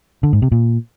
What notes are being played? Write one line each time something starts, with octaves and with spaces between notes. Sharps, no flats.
D3
G#2
C3
A#2